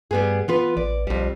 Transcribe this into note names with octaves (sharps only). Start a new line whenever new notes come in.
G2 G3 B3 G#4
E3 B3 F4 B4
A1 D5
B1 F2 G3